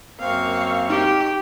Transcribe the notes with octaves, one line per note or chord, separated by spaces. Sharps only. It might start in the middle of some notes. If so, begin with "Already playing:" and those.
F#2 A#3 C4 F5 C#6
D#4 G4